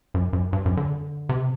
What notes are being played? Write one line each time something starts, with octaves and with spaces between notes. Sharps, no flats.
F#2
F#2
G2
F#2
D3
C3